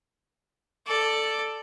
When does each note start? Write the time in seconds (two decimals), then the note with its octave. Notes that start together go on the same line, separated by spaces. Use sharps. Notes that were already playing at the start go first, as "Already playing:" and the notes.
0.87 A4 D5